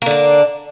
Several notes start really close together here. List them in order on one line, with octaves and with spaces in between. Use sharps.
A#3 D3 D4